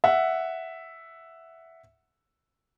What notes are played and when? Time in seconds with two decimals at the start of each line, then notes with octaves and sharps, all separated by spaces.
0.04 E5 F#5